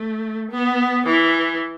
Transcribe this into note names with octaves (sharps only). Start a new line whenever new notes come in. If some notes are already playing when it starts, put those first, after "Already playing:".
Already playing: A3
B3
E3